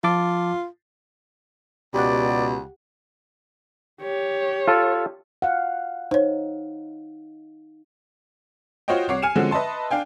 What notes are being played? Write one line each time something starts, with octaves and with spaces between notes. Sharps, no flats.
F3 F4 A5 D6
C#2 B2 G4 D5 F#5
G4 C#5
F4 A4
F5 F#5
D#4 C5 C#5
F4 F#4 C5 C#5 D#5 G5
C2 C#5 F#5 D6 C7
G#5 F6 C#7 D#7 E7
D3 F3 G#3 C4 C#4 F#4
B4 D#5 E5 A5 C6
D4 F5 G5 G#5